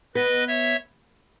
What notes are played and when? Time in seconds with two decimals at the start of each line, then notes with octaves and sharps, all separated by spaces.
0.15 B3 B4 D#5
0.47 C#5 E5